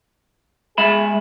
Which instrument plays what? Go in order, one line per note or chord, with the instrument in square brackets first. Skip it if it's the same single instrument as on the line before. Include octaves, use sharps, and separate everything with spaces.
[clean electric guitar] G#3 E5 B5 [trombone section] G#4